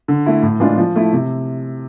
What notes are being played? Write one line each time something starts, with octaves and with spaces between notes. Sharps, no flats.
D3
A3 E4
A2
E3 G#3 D4 F4
F3
A3 E4
C3